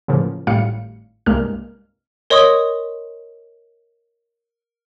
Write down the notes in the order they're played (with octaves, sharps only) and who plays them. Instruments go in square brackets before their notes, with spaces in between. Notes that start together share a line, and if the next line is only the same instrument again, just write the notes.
[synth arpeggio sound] A2 C#3 E3 F3 A#3
G#1 A2 G3 F5 C#7
C2 G2 G#3 A#3 F6
[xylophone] A#4 C#5 D#5 C6 C#6 D#6